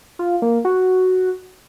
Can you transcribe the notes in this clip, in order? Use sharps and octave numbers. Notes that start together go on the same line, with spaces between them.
F4
A#3
F#4